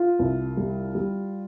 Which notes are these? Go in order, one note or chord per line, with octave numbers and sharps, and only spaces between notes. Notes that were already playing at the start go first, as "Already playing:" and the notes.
Already playing: F4
C2
G3
G3